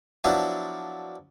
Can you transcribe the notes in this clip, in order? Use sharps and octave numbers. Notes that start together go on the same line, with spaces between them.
F3 F#3 B3 D4 E4